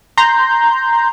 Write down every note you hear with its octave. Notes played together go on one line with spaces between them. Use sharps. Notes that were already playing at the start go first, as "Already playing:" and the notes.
A#5 C6 G6